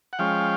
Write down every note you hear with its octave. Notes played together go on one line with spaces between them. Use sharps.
F#5
F3 G#3 C#4 F5 G5